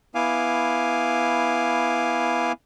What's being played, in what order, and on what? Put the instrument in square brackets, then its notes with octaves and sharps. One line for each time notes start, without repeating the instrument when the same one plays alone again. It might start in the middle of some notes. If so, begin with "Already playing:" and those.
[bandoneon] B3 E4 F5 G#5 D6